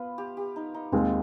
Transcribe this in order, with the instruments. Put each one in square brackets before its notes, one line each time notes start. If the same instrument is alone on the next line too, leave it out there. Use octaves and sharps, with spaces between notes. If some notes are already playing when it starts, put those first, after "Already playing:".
Already playing: [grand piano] B3 [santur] F4 B4
[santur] G4
G4
D#4
D#4
[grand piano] D#2 D#3 G#3 C4 [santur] F4